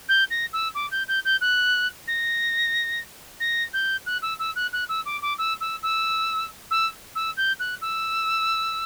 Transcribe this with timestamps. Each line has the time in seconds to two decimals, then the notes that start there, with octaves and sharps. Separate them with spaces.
0.09 G6
0.30 A#6
0.53 E6
0.75 D6
0.91 G6
1.08 G6
1.25 G6
1.41 F#6
2.07 A#6
3.40 A#6
3.73 G6
4.06 F#6
4.22 E6
4.39 E6
4.55 F#6
4.73 F#6
4.89 E6
5.05 D6
5.22 D6
5.38 E6
5.61 E6
5.83 E6
6.71 E6
7.15 E6
7.37 G6
7.59 F#6
7.81 E6